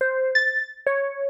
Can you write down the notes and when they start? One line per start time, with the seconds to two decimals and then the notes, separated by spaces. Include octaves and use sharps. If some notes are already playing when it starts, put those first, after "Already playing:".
0.01 C5
0.35 A6
0.87 C#5